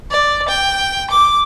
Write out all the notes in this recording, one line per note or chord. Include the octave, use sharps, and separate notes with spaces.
D5
G5
D6